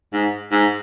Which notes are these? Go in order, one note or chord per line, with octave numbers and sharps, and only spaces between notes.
G#2
G#2